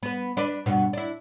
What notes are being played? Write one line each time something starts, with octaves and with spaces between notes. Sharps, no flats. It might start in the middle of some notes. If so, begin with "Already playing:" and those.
B3 B4
D4 B4 D5
G2 B2 B3
D4 E4